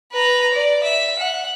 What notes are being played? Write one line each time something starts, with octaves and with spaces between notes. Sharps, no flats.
B4 A#5
D5
E5
F#5